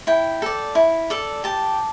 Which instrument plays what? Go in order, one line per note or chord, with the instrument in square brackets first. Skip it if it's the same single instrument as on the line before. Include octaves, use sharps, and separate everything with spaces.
[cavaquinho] E4 G5
A4 D5
E4
A4 D5
G4 A5